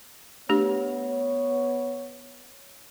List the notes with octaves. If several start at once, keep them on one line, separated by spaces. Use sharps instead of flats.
A3 B3 D4 G4 C#5